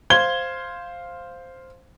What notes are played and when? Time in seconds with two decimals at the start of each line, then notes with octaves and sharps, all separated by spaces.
0.10 C5 F5 C6 G#6 G7